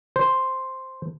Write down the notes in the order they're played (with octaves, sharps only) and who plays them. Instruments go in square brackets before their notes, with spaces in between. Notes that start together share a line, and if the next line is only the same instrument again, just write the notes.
[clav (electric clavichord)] C5